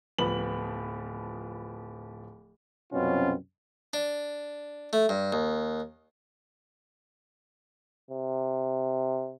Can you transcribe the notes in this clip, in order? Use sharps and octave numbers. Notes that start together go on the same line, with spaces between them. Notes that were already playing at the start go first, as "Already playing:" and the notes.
D1 F3 B3 B5 F#7
C2 F#2 B2 C4 C#4 F4
D4
A3
G2
D#2
C3